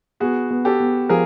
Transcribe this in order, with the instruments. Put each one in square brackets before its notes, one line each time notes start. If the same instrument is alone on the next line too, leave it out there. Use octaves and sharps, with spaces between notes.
[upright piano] B3 [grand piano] F#4 G#4
[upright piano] B3
[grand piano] G4 A4
[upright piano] B3
[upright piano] F3 [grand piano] G#4 A#4